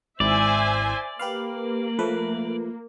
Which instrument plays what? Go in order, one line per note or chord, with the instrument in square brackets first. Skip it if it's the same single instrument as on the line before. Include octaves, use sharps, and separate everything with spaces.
[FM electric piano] G#1 E4 [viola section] C5 E5 G#5 [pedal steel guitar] D5
[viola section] A#3 [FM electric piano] G4 B4 F5
[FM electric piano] F3 A3 B4